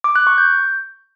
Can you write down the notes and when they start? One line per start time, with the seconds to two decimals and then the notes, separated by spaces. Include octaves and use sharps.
0.04 D6
0.16 F#6
0.27 C#6
0.38 G6